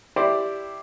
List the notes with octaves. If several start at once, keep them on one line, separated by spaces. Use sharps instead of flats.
E4 G4 C5 D5